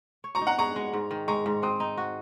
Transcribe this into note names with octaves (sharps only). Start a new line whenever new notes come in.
C#5
A#5 C#6
D#4
F#5 A#5
G#4 A#5 C#6
G#3
G#2
D#3
G#3 A#5 C#6
G#2
C4 C6 D#6
D#4
F#4